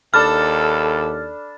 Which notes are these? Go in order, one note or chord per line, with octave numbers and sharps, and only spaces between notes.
D#2 D4 A4 A5 B5 F6